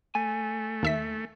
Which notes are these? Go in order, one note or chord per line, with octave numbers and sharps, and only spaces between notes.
A3 G#5
D#2 E5 B6